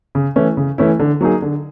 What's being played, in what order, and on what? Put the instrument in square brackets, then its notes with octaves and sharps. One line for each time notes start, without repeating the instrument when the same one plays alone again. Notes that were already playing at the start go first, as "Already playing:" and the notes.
[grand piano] C#3
E3 A3 C#4 E4
C#3
E3 A3 C#4 E4
D3
F#3 A#3 D#4 G#4
D3